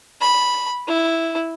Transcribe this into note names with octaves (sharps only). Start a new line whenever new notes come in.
B5
E4